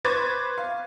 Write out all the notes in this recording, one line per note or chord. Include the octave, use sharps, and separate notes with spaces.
B4 C5 C#6 D6 G#6 A6
F5